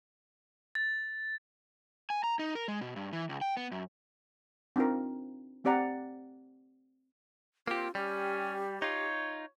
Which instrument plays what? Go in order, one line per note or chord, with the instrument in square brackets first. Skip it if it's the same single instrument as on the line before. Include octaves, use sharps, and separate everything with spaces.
[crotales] A6
[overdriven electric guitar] G#5
A#5
D#4
A#4
G#3
B2
G2
E3
C#2
G5
B3
F#2
[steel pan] C4 D4 D#4 F4 A#4
A3 C4 G4 D5 F#5 A#5
[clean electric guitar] A#3 G4 [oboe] C4 [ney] F4
[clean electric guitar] G3 [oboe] C#4 [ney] G4
[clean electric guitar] D#4 F4 [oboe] C#5